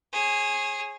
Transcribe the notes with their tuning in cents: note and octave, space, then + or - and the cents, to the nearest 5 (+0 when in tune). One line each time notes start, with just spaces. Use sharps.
G#4 +0 C#5 -30